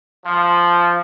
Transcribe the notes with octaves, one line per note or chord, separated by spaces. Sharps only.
F3